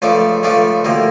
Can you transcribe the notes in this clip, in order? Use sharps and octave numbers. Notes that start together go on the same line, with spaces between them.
C#2 C#3 F3 A3 D4
C#2 C#3 F3 A3 D4
D2 C3 F3 A#3